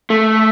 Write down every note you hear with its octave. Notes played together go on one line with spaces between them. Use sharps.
A3